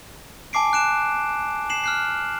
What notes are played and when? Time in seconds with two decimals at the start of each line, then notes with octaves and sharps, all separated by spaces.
0.53 G#5 A5 D6 C7 D7
0.73 F#6 D7 E7
1.70 C7 E7 F#7
1.84 F6 F#6 C7